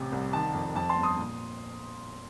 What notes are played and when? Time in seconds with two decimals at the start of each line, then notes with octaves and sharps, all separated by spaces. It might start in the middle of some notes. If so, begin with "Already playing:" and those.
Already playing: A1 C3
0.12 C2
0.33 D#3 A5
0.54 F2
0.75 F2 A5
0.89 A5 C6
0.96 G1
1.03 C6 D#6
1.18 A#2